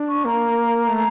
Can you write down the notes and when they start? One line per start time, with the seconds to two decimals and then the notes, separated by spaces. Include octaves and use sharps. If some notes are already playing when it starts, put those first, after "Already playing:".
Already playing: D4
0.08 C#6
0.25 A#3 A#5
0.88 A3